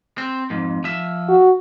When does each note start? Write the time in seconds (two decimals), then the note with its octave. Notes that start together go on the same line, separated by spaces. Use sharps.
0.18 C4
0.50 F2 G#2
0.84 F3 E5
1.28 F#4